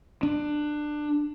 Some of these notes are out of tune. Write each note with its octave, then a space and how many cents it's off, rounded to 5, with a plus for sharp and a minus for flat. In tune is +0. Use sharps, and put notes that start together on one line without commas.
D4 +20